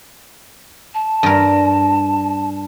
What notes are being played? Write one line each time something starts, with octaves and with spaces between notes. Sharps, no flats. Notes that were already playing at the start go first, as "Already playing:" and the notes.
A5
G2 A#4